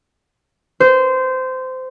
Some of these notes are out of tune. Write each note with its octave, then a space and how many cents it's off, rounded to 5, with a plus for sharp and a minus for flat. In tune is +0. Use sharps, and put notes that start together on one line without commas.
C5 -20